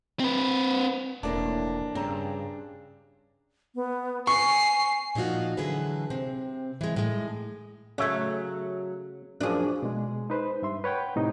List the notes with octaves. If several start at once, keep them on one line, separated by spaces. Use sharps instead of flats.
C4 B4
E1 F2 A2 A#3 D4
G2 C#3 C4 A5 A#5
B3
G#5 C#6 C7
A#2 F3 D#4 F4 F#4
D3 E3 F#3 G#4 A4 B4
C3 C4
E3 G#3
A2 G#3
C#3 F#3 A3 C#5 E5
F#2 F3 D4 G#4
B2 G#3
D#4 B4 C5
G2 E5 C6
B4 C#5 F#5 G5
A2 C3 D#4